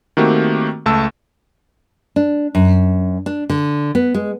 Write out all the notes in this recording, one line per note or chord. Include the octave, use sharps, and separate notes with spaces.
D#3 A3 A#3 C4 F#4 G4
C#2 A3 A5 E6 E7
D4
F#2
D4
D3
B3
G#3